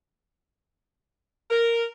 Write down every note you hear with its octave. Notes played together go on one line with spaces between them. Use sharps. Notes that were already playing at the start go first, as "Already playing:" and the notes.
A#4